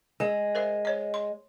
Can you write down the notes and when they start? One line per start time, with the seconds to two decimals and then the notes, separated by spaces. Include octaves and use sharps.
0.20 G#3 G#4
0.55 A#4 C5 E5
0.85 C5 C#5 D#5
1.14 C6